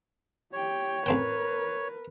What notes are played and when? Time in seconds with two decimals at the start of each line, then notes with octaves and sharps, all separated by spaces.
0.53 G4 C#5 G5
1.06 A1 C4 A#4 B4 G5